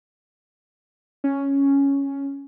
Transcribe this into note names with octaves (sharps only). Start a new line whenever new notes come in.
C#4